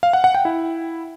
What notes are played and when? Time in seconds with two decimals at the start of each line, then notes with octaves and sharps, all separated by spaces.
0.03 F5
0.13 F#5
0.24 F#5
0.35 G5
0.45 E4